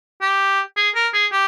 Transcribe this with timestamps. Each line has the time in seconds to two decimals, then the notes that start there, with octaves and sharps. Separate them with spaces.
0.22 G4
0.77 G#4
0.95 A#4
1.13 G#4
1.33 G4